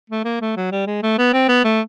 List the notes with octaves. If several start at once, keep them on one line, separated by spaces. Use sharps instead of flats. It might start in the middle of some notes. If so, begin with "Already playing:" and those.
A3
A#3
A3
F#3
G3
G#3
A3
B3
C4
B3
A3